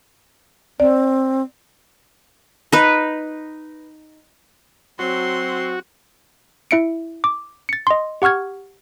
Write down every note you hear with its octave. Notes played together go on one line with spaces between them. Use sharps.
C4 D5
D#4 B4
F#3 C4 F#4 C6
E4 E5 C#7 D7
D6
A6 C#7
D#5 C6
G4 F#5 C#6 F6 G#6